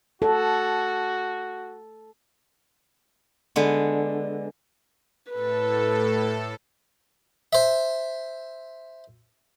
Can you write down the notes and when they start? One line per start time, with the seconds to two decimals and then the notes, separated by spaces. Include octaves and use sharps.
0.22 F#4 A4
3.56 D3 G#3 B3
5.31 A2 A4 B4
7.53 C5 E5